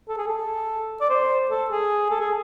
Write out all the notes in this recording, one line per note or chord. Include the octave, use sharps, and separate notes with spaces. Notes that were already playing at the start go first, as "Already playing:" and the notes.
A4
G#4
A4
D5
C5
A4
G#4
A4
G#4